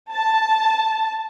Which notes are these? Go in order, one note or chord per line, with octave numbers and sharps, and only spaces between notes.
A5